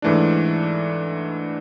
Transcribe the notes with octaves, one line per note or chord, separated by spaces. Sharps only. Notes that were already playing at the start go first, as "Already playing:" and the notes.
G#2 E3 A3 D4